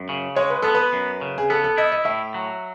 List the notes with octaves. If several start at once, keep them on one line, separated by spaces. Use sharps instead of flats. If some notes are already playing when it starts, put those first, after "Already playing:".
Already playing: F#2
C#3
G#3 C#5
B4
B3 A4
B4
F#2
C#3
G#4
B3 A4
A4
E4 D#5
D#5
A2 E5
F#3